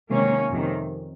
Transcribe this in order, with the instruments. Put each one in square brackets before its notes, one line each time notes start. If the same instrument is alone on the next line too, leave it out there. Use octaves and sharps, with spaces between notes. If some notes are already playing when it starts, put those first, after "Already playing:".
[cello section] C3 D#3 G#3 A#3 C#4
F2 C3 D#3